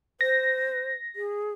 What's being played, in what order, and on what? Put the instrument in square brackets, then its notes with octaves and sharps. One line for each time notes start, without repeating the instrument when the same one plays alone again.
[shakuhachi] C5 [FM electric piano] A#6
[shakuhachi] G#4